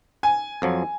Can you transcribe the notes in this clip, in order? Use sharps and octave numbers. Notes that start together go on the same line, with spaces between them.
G#5
F2 F3 F#3